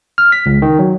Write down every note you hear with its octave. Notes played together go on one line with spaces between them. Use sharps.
F6
B6
C#2
D#3
F#3